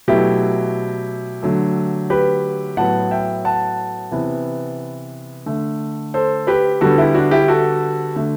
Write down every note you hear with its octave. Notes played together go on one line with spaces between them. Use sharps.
B2 F#3 A3 E4 G4
D3 F#3 A3
G4 B4
A2 F#3 B3 F#5 A5
E5 G5
F#5 A5
C3 E3 B3
D3 A3
A4 C5
G4 B4
D3 G3 B3 F#4 A4
E4 G4
D4 F#4
E4 G4
F#4 A4
D3 A3